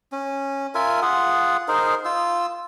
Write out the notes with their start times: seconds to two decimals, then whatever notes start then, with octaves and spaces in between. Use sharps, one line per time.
0.12 C#4
0.75 F4 A#4 E5 G#5
1.02 F4 G#4 F#5
1.68 D#4 G#4 A#4 C5
2.05 F4 E6